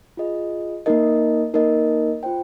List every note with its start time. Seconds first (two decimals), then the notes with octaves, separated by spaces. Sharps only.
0.17 F4 G#4 D#5
0.86 A#3 D#4 A#4 D#5
1.54 A#3 D#4 A#4 D#5
2.23 F4 C5 G5